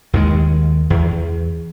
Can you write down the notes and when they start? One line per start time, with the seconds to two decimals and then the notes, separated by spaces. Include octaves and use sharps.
0.13 D#2 D#3 E3 G#3
0.90 E2